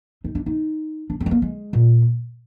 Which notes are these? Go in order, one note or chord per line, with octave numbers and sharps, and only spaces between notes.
D#4
D4
D#4
D4
C4
G#3
A#3
G#3
A#2